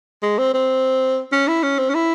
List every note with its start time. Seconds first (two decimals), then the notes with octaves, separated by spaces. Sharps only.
0.23 G#3
0.38 C4
0.54 C4
1.32 C#4
1.48 E4
1.63 C#4
1.79 C4
1.90 C#4
1.95 E4